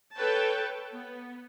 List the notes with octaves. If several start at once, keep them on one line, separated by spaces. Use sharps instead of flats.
A4 B4 C#5 G5 A5
B3